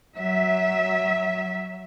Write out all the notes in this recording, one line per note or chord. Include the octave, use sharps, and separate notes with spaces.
F#3 E5